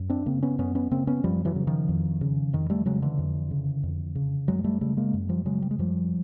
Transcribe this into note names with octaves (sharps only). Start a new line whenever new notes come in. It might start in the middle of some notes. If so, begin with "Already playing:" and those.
Already playing: F#2
C4 D4
C#3 A#3 C4
B3 C#4
F#2 B3 C#4
B3 C#4
C#3 A#3 C4
B3 C#4
F#2 F3 G3
E3 F#3
C#3
D#3 F3
F2
C#3
F2 D#3
G3 A3
C#3 F#3 G#3
D3 E3
F2
C#3
F2
C#3
F#2 F#3 G#3
G#3
G3 A3
C#3 G3 A3
G#3 A#3
F#2
F3 G3
C#3 F#3 G#3
G3
G#3
F#2 F3 G3